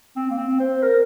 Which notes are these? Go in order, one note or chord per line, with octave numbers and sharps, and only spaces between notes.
C4
A#3
C4
C5
A#4